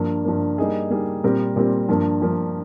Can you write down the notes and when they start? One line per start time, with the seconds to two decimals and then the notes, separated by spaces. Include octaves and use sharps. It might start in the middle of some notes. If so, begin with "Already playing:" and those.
Already playing: G2 F3 A#3
0.25 G2 F3 A#3
0.58 G3 A#3 D#4 G#4
0.90 G3 A#3 D#4 G#4
1.24 A#2 G3 C4 G4 A#4
1.56 A#2 G3 C4 G4 A#4
1.88 G2 F3 A#3
2.22 G2 F3 A#3